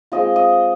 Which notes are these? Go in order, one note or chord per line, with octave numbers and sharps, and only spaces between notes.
G#3 C4 F4 D#5
D#5